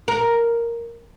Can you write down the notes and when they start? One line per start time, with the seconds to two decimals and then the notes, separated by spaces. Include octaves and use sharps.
0.08 A#4